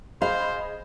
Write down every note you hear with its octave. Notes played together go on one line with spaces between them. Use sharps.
G#4 C5 D#5 F5 B5